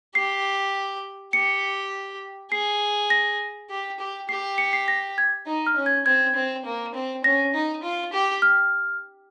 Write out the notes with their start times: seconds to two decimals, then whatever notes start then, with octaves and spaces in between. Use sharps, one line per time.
0.15 G4 C7
1.33 G4 C#7
2.51 G#4 C7
3.10 A#6
3.70 G4
3.99 G4
4.29 G4 C7
4.58 C#7
4.73 C7
4.88 A#6
5.18 G#6
5.46 D#4
5.67 F6
5.76 C#4
5.86 G#6
6.06 C4 G#6
6.35 C4
6.65 A#3
6.94 C4
7.24 C#4 A#6
7.54 D#4
7.83 F4
8.13 G4
8.42 F6